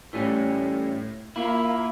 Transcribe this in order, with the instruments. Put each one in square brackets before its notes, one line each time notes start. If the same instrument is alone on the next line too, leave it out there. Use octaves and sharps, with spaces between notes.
[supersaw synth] A2 [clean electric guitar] E3 G3 C#4
[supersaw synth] A#3 [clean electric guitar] E4 F4